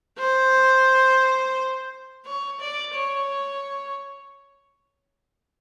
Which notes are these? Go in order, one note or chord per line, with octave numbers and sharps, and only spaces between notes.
C5
C#5
D5
C#5